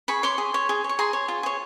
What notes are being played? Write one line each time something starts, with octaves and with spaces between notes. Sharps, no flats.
G#4 B5 C#6
C#5 C6 D6
G#4
C#5
G#4
C#5
C#6
G#4 A#5 C6
C#5
F4
G#4 C#5